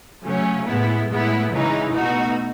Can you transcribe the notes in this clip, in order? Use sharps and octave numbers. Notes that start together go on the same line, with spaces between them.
C#3 F#3 A3 C#4
A2 G#3 B3 E4
A2 G#3 B3 E4
C#3 E3 G#3 D#4
B2 A3 D#4 F#4